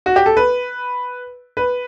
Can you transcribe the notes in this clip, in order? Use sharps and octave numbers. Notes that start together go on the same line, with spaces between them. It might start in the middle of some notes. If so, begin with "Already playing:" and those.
F#4
G4
A4
B4
B4